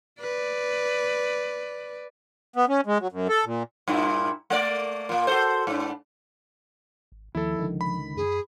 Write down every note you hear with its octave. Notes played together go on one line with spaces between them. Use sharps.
B4 D5
B3
C#4
G#3
F#3
F#2
A4
A#2
G2 A#2 E4
A3 A#3 D5
A#2 A#3
F#4 A4 C5
G#2 D4
G#1
D#2 F3 E4 A4
C#2 D3 D#3
B5
F#2 G#4